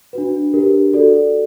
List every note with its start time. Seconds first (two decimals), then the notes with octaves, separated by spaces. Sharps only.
0.13 D4 F#4 B4
0.54 D4 G4 A#4
0.93 F#4 A4 D5